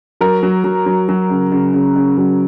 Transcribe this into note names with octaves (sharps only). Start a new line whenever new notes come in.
F#3 A#4
F#3
F#3
F#3
F#3
C#3
C#3
C#3
C#3
F#3